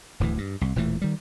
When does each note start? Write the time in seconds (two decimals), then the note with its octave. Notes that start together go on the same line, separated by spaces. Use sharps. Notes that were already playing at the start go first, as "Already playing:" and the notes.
0.20 D1 D2 A2 E3
0.38 G2
0.61 C2
0.76 E1 A#2 E3 A3
1.02 D#3 G3